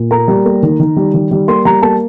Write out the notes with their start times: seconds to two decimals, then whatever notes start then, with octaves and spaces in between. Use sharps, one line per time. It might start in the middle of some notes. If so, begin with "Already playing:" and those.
Already playing: A#2
0.11 A#3 A#5
0.28 G3
0.45 A#3
0.62 D#3
0.79 D#3
0.97 G3
1.14 D#3
1.31 G3
1.48 A#3 C6
1.65 G3 A#5
1.82 A#3 A5